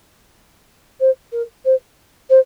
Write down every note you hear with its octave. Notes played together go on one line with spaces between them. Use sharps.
C5
A#4
C5
C5